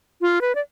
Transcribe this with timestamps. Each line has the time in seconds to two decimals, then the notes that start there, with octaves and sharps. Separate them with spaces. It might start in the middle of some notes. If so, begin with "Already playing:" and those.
0.21 F4
0.41 B4
0.55 D5